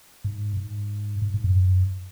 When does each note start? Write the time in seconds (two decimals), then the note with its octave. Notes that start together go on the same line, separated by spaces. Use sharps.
0.24 G#2
0.57 G#2
1.22 G#2
1.34 G#2
1.44 F#2